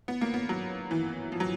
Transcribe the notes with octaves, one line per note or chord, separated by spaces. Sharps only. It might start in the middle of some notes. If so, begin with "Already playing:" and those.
B3
A#3
B3
F#3
E3
F3
F#3